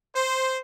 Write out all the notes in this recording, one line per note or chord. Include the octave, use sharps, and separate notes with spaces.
C5